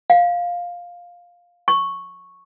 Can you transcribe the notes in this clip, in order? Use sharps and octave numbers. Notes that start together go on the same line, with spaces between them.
F5
C#6